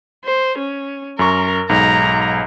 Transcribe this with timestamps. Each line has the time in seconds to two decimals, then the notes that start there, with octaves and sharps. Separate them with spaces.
0.25 C5
0.58 C#4
1.19 F#2 A#4 A#5 C#6
1.69 B1 G#2 A#5